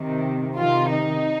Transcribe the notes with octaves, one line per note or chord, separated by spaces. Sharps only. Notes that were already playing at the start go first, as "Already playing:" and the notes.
Already playing: C3 D#3
C3 D#3 F4
D#4